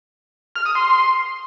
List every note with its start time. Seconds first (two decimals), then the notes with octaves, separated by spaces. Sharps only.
0.56 F6
0.66 D#6
0.75 C6